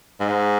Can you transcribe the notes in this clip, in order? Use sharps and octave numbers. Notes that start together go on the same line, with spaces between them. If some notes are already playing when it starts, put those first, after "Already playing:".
G#2